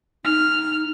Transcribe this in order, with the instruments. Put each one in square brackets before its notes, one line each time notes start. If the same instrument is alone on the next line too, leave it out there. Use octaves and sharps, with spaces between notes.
[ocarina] D#4 [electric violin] F6